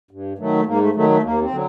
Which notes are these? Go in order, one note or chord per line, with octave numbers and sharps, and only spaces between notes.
G2
D#3 F#3 A3
G#2 A#3
A3
D#3 F#3 A3
A3
D#2 A#3
C4
D3 F#3